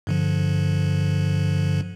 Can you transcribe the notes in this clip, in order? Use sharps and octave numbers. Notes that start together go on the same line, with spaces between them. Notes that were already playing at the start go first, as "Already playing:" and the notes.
G2 D3 F3